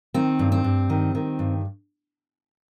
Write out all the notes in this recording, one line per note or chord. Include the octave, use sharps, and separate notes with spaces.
D#3 C4
G2
C4
G2
D#3
D#3
G2